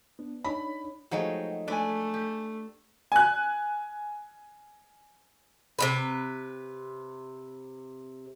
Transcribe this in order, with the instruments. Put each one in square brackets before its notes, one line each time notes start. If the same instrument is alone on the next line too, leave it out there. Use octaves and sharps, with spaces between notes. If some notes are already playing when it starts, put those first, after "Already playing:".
[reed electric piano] B3 D4
[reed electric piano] D4 D#4 C#5 [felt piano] B5
[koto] F3 F#3 G#3 [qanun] A3 D#4 G#4 [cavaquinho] F#4 G5
[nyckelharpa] A3 [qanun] D4 B4 D5 [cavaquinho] G#5 B5 D6
[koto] G4
[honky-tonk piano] G#5 F#6
[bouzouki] C3 F#3 B4